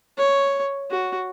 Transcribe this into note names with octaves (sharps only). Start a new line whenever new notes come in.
C#5
F#4